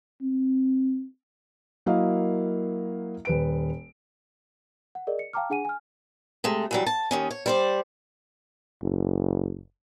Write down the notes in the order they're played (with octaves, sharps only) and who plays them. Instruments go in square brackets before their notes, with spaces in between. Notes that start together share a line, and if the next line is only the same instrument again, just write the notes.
[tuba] C4
[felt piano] F#3 A#3 E4 A#4 D#5 F5
D#1 B4 D7
[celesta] F#5
G#4 A#4 D5 D#5
C#7
F5 G5 A5 A#5 D6 F6
D4 G#4 F#5 G#5 D#7
G#5 F6
[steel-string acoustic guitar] C3 G#3 A3
E3 F#3 G3
A5
D#2 D#3 C#4
C#5
G3 C5 D5
[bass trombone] F#1